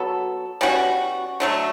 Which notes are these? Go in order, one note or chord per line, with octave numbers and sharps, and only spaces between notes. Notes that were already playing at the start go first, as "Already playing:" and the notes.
Already playing: F#3 B3 F#4 A4
B2 G3 C#4 F#4
D3 F#3 A3